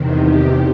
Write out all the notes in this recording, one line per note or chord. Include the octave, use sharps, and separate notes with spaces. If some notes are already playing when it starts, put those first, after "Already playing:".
Already playing: E2 C3 D#3
G4